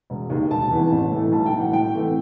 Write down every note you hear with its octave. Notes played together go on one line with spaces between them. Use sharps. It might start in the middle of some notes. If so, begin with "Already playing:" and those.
E1
D#2 D#3
E1 A5
E2 C3 E3
A1
A2 E3 A3 E4
B1 A5
G5
A2
E3 F#5
A2 G5
E3 A3 C4